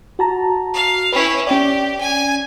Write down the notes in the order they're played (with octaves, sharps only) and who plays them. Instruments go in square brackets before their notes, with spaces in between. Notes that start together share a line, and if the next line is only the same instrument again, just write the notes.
[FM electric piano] F#4 A5 A#5
[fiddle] F5
[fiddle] C#4 E4 [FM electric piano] B4
[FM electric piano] C#4 D5 [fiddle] G4
[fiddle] G#5